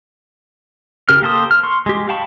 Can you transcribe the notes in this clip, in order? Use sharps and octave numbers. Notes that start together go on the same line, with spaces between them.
C#3 G4 A#4 F6
A#3 G4 A4 C5 D#6
F6
C6 C#6
G#3 G4
F5 G5 A5 B5 C#6